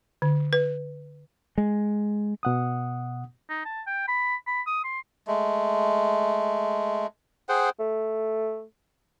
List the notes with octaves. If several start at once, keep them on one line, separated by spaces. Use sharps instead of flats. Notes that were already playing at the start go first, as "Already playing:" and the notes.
D3
B4
G#3
B2 F#5 D#6
D#4
A5
G5
B5
B5
D#6
C6
G#3 A3
G#4 C5 F#5 G5
A3